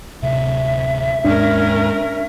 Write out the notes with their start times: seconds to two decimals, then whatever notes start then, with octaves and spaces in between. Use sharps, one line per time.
0.22 D1 C3 E5
1.25 D#2 G#2 G#3 C#4 D4 A#4